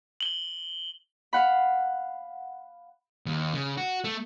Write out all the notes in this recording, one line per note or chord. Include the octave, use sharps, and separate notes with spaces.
F#7 G7
F5 F#5 B5
D#2
C#3
F#4
A3